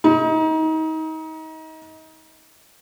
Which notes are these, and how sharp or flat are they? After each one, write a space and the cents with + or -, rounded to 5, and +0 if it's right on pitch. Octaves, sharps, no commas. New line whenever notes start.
D#4 +30